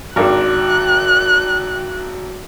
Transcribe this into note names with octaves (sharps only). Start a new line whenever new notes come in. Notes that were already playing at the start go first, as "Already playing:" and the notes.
G#1 D#3 D4 F#4 D6 F#6